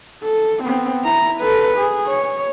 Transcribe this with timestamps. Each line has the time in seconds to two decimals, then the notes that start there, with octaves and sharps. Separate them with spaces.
0.24 A4
0.64 B3 C4
1.04 E4 A#5
1.41 A4 B4
1.78 G#4
2.07 C#5